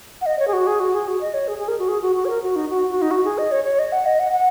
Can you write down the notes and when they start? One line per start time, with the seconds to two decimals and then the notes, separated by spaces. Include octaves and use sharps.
0.21 F#5
0.26 D#5
0.39 C#5
0.48 G#4
0.53 F#4
0.67 G#4
0.80 F#4
0.94 G#4
1.08 F#4
1.21 D#5
1.34 C#5
1.48 G#4
1.58 G#4
1.68 A#4
1.79 F#4
1.88 G#4
2.02 F#4
2.16 F#4
2.25 C#5
2.29 A#4
2.43 F#4
2.56 D#4
2.69 F#4
2.90 F#4
3.02 D#4
3.11 F#4
3.24 G#4
3.38 D#5
3.52 C#5
3.64 C#5
3.79 D#5
3.92 F#5
4.06 D#5
4.19 F#5
4.33 F#5